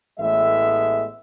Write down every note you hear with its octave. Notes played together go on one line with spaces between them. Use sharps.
A1 A2 E3 G#3 B3 E5